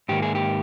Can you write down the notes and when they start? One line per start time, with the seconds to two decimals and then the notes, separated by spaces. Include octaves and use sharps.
0.09 G#2 D#3 A#3 G4
0.22 G#4
0.35 G4